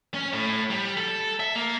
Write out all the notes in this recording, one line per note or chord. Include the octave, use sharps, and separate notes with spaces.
C#4
A2
G3
A4
E5
A#3